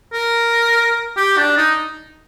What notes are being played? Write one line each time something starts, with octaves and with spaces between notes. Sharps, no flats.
A#4
G4
D4
D#4